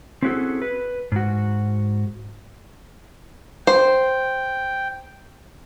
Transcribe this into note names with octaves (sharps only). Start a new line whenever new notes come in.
C4 C#4 E4 F#4 G#4 A4
B4
G#2 F#4
C5 G5